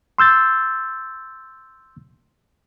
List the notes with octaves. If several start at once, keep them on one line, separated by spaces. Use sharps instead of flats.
C6 E6 G6 A6